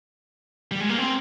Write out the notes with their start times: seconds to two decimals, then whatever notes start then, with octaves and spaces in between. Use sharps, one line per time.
0.71 G3
0.80 G#3
0.89 A#3
0.98 C4